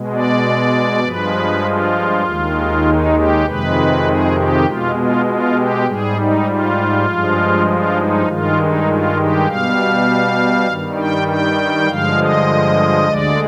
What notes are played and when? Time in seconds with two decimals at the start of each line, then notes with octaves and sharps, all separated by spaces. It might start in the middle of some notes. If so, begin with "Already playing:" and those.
Already playing: B2 G#3
0.13 D5
1.04 G2 F3 G#3 B4
1.64 F4
2.24 D#2 D#3 G#3
2.84 D#4
3.14 G4
3.45 F2 C3 D#3 G#3 B4
4.04 G#4
4.35 G4
4.65 B2 G#3 F4
4.95 F4
5.25 F4
5.56 G4
5.86 G#2 G3 G#4
6.16 D#4
6.46 F4
7.06 G2 F3 G#3
7.66 F4
7.97 D#4
8.26 G2 D#3 G#3 F4
8.57 D#4
8.86 F4
9.17 G4
9.47 B2 G3 F5
10.68 G2 D#3 G3
10.97 G5
11.28 G5
11.88 G2 D3 F3 G#3 F5
12.18 D#5
13.08 D2 D3 G#3 D5